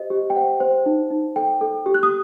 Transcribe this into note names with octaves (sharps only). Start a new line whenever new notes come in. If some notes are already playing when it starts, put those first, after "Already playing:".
Already playing: G4 C5 D#5
G4
G5
C5 F#5
C5
D#4
D#4
A4 G5
A4
G4
F#6
D#6